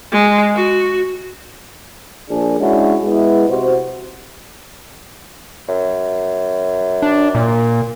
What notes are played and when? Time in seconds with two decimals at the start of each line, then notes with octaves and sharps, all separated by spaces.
0.12 G#3
0.55 F#4
2.30 A#1 D4 G#4
2.60 G#3 C#4 D4 E4 F#4
3.04 G#3 B3 E4
3.49 C3 F#4 C5
5.68 F#2
7.02 D4
7.35 A#2